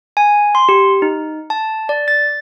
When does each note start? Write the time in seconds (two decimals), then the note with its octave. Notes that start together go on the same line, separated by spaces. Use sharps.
0.17 G#5
0.55 C6
0.69 G4
1.02 D#4
1.50 A5
1.89 D5
2.08 A6